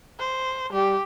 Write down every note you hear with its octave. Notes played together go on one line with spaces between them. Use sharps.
C5
G3 G4